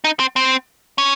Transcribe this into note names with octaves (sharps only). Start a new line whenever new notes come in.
D#4
C4
C4
C#4